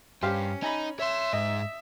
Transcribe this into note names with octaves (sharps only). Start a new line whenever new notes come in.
G2 C#4 G4 C5 F5
D#4 G#5 A#5 B5
C#5 E5 C6
G#2 D#5